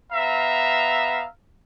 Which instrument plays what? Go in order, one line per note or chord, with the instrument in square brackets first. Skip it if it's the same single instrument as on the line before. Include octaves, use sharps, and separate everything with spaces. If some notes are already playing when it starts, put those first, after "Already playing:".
[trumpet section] B3 E5 F5 A#5